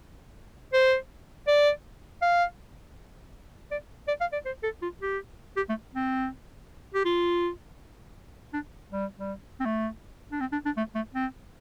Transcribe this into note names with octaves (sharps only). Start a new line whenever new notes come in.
C5
D5
F5
D5
D5
F5
D5
C5
A4
F4
G4
G4
A3
C4
G4
F4
D4
G3
G3
C4
A3
D4
C4
D4
D4
A3
A3
C4